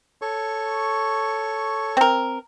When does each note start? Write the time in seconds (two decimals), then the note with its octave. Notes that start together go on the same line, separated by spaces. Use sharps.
0.22 A4 C#5 C#6
1.97 C4 A#4